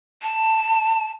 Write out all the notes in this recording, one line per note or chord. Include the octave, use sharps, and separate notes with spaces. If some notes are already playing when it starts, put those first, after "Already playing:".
A5